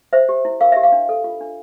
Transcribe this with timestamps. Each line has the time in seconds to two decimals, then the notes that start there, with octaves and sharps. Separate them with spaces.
0.13 C5 E5
0.29 G4
0.45 E4
0.61 A#4 F5
0.72 G4 E5
0.83 F5
0.92 D4
1.09 A4
1.24 F4
1.41 D4